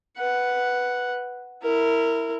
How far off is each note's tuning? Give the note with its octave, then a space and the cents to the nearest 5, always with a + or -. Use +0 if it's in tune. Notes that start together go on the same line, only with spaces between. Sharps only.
B4 +0 F#5 +0
E4 +0 A#4 -20